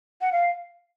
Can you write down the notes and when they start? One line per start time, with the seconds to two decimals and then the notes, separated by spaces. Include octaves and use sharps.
0.21 F#5
0.32 F5